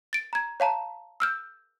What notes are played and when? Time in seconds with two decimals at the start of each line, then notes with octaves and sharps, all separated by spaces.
0.13 A6 D7
0.33 A#5 G#6
0.60 C#5 F5 A5 A#5
1.20 E6 F6 G6